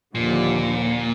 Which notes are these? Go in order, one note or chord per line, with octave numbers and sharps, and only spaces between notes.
D#2 A#2 D3 F3